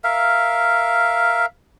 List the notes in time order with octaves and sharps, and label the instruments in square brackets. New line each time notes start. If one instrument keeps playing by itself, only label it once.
[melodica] A#4 E5 F5